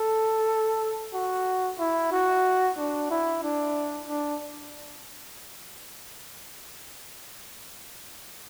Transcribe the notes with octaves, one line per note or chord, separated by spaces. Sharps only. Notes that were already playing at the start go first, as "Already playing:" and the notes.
Already playing: A4
F#4
E4
F#4
D4
E4
D4
D4